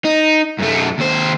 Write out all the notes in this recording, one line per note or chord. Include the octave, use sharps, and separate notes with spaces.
D#4
F#2 A3
D#2 C5